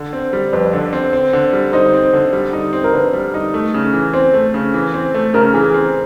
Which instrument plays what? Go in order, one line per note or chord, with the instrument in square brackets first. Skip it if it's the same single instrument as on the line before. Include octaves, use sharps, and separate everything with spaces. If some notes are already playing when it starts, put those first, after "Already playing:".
Already playing: [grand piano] D3
C4
G3
[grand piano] F2 [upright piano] B4
[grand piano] D3
C4
C4
D3
G3
[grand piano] D#4 [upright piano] C5
[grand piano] C4
D3
G3
D#4
C4
[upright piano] A#4
[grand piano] D3 [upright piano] B4
[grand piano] G3
D#4
A3
C#3
E3
[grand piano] C4 [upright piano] C5
[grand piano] A3
C#3
E3
C4
A3
[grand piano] C#3 [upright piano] A#4
[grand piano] E3 [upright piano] G#4
[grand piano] C4